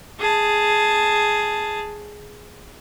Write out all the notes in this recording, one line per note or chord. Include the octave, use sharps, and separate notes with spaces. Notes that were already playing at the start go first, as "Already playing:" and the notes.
G#4 A5